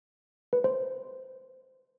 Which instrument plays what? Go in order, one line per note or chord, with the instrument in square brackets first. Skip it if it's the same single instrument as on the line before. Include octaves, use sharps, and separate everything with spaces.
[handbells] B4
C5